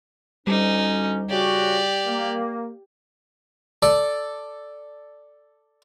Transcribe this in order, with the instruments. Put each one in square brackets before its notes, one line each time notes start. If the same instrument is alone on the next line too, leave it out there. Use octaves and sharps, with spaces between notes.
[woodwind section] D2 C#4 [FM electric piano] G3 [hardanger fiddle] D#4
[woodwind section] C#3 F#4 [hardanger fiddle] G4 D5
[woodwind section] A#3
[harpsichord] A4 D5